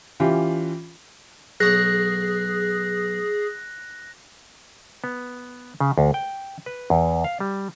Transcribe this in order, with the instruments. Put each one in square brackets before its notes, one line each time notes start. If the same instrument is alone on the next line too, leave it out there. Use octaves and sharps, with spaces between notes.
[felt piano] E3 C#4 F4 G4
[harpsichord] B1 C#5 F#5 [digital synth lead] G#4 [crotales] F#6 A#6
[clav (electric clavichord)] B3
C#3
D2
G5
B4
E2
F5
G3